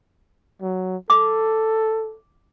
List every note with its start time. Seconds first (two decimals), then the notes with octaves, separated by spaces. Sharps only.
0.62 F#3
1.10 A4 D6